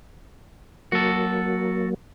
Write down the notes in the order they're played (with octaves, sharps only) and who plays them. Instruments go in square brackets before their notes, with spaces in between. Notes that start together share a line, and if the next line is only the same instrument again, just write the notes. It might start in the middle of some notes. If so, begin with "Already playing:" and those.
[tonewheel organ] F#3 A#3 [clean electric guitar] F#4 A4